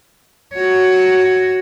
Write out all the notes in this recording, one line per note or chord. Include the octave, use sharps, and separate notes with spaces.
F#4 C#5